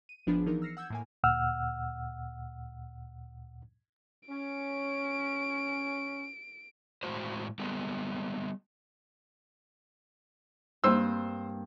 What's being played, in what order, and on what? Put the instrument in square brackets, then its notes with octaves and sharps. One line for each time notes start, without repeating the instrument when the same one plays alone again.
[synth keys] D#7
G#1 F3 B3 D4 G#4 B5
E3 F3 D#4 A#4
E6 F6 A#6 C7 C#7
F#5 E6 G6 G#6
A2 A#3 G#5
[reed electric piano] D2 A#2 F#5 E6 F6
[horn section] C#4 [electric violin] D7
[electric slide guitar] A2 G#3 F#4 C5
G3 G#3 B3
[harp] G2 A#3 C4 [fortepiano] C5 E6